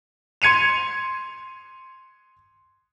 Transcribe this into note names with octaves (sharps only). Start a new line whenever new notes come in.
C6 G#6 C#7 D#7 F7